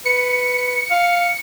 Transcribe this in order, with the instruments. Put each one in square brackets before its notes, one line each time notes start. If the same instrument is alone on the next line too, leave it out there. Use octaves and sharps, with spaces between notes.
[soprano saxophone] B4 [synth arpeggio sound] C#7
[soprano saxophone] F5